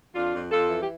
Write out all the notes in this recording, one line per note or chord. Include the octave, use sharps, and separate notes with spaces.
F2 D4 F4
F2
F2 F4 A4
E3
G4